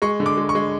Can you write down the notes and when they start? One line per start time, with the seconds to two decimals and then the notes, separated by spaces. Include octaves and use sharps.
0.02 G#3 C#6
0.20 D3
0.26 D6
0.38 G#3
0.49 C#6
0.55 G#3